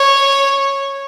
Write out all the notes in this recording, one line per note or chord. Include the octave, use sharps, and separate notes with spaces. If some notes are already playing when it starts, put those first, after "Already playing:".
Already playing: C#5